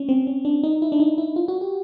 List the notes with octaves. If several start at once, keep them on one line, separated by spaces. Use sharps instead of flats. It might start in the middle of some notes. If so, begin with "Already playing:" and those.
Already playing: C#4
C4
C#4
D4
D#4
E4
D4
D#4
E4
F4
F#4
G4